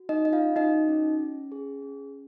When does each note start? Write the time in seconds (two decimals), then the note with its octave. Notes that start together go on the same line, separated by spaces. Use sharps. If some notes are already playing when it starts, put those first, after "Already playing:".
Already playing: F#4
0.09 D#4 D#5
0.25 C#4 D#5
0.33 F4 F5
0.56 D#4 F#4 D#5
0.89 C#4
1.19 C#4
1.52 G#4
1.82 C#4